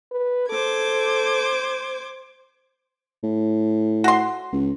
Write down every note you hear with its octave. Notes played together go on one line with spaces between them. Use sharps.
B4
A4 C5 D6 G#6
A2
F#4 C6
C#2